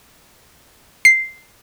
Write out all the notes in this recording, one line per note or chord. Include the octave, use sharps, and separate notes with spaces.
C7